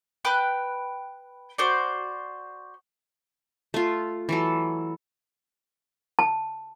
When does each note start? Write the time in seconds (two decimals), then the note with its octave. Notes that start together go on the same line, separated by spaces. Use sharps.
0.25 B4 G5 B5 F#6
1.58 F#4 C5 D5
3.74 A3 F4
4.29 E3 F#3 A4
6.19 A5